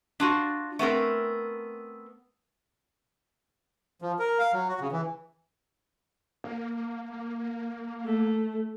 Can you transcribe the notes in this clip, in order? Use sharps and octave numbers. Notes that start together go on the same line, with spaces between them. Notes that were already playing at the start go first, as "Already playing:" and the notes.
D4 F4 F#4
A3 B3 C4 A#4
F3
A#4
F5
F#3
F#4
C#3
E3
A#3
A3